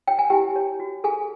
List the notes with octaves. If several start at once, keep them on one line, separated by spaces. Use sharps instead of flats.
C#5 G5
G#5
E4 G4 G5
C#5
F#4
G#4 A4 G#5